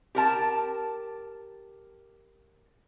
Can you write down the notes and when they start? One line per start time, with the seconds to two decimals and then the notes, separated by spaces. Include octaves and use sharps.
0.15 G4 A#4 A5